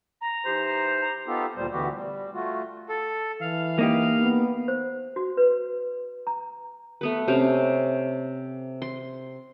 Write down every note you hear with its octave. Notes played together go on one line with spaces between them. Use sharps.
A#5
E3 D#4 G4 C5
A#5
B3 D#4 F4 G4 A4
D2 A#2 G3 C5
D2 D3 E3 B3 F#4 G4
G3
A3 F4 F#4
A4
E3 F5
A#3 D#4 G4
B3
C5
F#4
B4
A#5
A3 B3 B4
C3 C#4 C5 F5
C6